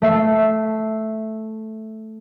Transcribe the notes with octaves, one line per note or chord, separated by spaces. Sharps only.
A3 E5 C7